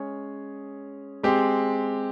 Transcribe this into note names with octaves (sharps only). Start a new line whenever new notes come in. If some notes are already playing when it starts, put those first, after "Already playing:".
Already playing: G#3 C#4 G#4 C#5
G#3 C4 G4